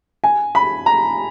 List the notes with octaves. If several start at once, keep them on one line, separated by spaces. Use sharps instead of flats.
G#5
B5
A#5